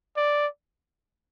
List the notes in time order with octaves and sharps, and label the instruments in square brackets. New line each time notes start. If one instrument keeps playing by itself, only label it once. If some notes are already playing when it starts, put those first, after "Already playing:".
[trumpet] D5